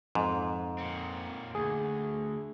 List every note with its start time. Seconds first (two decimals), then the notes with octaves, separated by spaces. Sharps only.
0.15 F2 G#2
0.78 A#2 C4
1.55 D2 G#4